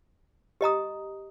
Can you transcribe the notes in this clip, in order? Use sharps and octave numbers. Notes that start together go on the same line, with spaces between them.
G4 D#5 A#5 D#6